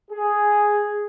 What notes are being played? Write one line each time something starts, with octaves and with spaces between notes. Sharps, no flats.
G#4